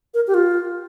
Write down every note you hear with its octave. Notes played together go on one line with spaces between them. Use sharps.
A#4
G4
F4